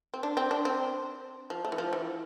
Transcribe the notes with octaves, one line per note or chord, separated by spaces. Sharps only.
C4
D4
C4
D4
C4
F3
A3
E3
F3
E3